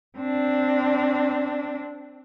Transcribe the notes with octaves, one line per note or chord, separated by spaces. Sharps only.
C4 D4